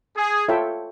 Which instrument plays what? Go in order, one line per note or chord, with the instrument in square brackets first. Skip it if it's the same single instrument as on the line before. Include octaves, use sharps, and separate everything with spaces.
[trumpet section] G#4
[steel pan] F4 A4 C#5 E5 G5